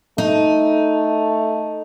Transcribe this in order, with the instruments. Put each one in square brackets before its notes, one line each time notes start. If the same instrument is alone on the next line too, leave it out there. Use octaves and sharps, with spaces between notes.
[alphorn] A3 [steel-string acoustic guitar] D#4